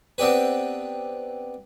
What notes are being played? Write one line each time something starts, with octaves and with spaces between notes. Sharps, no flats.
B3 C4 D4 G4 B4